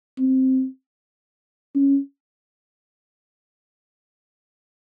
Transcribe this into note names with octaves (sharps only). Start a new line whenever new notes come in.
C4
C#4